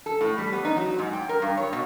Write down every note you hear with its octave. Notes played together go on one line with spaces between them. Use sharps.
A4
A2
G3
B3
D#4
F#3
G#2
G5
A#4
G2
C#5
B2